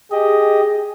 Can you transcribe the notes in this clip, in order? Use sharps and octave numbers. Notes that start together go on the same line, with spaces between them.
G4 G#4 D#5